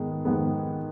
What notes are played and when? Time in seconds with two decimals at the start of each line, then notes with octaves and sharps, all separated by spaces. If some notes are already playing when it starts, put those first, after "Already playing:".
Already playing: G#2 D#3 G#3 B3
0.25 G#2 D#3 G#3 B3